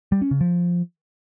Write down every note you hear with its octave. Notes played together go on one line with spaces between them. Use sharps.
G3
C#4
C#3
F3